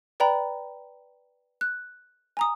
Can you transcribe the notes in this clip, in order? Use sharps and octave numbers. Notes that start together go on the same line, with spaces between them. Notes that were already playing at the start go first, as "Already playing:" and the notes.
B4 D5 G5 A#5 B5
F#6
G#5 A#5 D#6